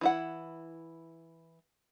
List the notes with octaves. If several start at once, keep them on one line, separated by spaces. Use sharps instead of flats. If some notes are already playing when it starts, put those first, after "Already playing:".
E3 E4 F#5